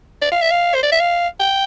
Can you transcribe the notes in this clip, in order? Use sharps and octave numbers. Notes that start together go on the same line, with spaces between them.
D5
F5
E5
F5
C5
D5
E5
F5
G5